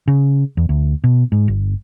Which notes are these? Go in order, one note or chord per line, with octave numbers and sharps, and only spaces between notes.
C#3
E2
D2
B2
G#2
G1